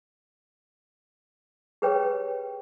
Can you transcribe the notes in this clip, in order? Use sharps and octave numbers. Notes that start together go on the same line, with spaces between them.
G4 G#4 B4 C#5 G5